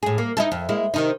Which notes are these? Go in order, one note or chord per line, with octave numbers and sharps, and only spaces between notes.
A2 G#4
A#3
D#4 E4 A4
F2
G#3 A#3 E4
C3 D#3 D#4